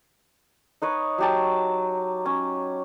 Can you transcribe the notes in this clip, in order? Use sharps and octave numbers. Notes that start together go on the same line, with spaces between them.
D#4 B4 C#5
F#3 G4 A5
C#4